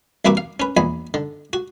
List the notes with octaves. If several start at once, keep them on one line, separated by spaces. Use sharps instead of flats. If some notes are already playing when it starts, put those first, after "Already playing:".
C2 E3 A#3 F#4 E5 D6
F5
C#4 B4
A#1 E2 G#5 B5
D3
F#4